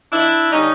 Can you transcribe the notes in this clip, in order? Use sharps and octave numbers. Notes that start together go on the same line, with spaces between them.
F2 D4 E4
D3 G3 C#4 D#4